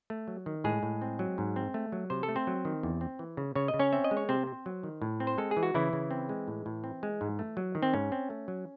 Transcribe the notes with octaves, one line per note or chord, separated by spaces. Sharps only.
A3
F#3
D#3
A2 G#3 G#4
A2
C4
F#3
G#2
C4
A3
F#3
C3 C5
A4
A3
C4 C5
F#3
D#3
E2
C4
E3
C#3
C#3 C#5
D#5
C#3
C#4 C#5
C4 E5
D#5
G#3
C#5
C3 C4 C5
C4
F#3
D#3
A2
C4
C5
G#3 A4
G#4
E3
F#4
C#3 E3 E4
C#3
C4
G#3
A2
A2
C4
G#3
G#2
A3
F#3
D#3
C4
G#2 C#4
C4
A3
F#3